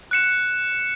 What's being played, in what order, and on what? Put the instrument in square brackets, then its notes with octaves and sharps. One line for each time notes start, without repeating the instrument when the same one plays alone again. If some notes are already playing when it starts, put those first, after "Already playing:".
[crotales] F#6 C#7 E7